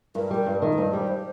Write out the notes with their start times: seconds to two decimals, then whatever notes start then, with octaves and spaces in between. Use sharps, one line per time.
0.15 G2 A#4
0.31 G3 A#4
0.46 G2
0.62 D#3
0.72 A#4
0.78 G2 C5
0.93 G3
1.09 C5